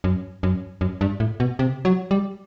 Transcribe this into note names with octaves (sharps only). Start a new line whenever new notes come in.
F#2
F#2
F#2
G2
A2
B2
C3
F#3
G3